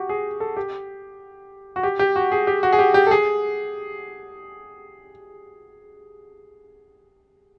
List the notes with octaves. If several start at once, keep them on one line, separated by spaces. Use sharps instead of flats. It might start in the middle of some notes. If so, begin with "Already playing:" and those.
Already playing: F#4 G4
G#4
A4
G4
F#4
G4
G4
F#4
G#4
G4
F#4
G#4
G4
G4
A4
G#4